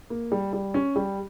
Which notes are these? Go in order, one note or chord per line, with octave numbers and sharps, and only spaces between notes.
A#3
G3
G3
C#4
G3